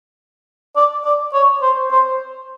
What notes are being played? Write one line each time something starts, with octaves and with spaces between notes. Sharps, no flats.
D5
D5
C#5
C5
C5